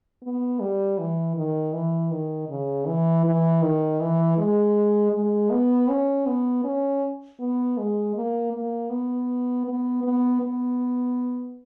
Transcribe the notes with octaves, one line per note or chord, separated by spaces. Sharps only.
B3
G3
E3
D#3
E3
D#3
C#3
E3
E3
D#3
E3
G#3
G#3
B3
C#4
B3
C#4
B3
G#3
A#3
A#3
B3
B3
B3
B3